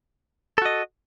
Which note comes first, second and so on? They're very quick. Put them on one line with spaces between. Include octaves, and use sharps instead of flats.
A4 F#4 D#5